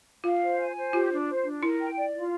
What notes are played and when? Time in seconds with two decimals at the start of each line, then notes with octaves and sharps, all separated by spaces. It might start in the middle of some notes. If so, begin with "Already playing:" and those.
0.24 F4 F5
0.42 C5
0.58 G#5
0.76 C5
0.93 F4 G4
1.11 D4
1.28 C5
1.44 D4
1.62 E4 A#4
1.80 G5
1.97 D5
2.14 F4